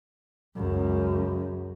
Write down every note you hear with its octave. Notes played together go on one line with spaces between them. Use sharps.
C#2 F#2